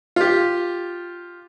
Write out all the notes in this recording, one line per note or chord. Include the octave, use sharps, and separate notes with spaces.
F4 G4